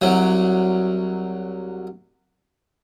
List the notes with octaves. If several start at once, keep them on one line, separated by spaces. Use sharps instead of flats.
C2 F#3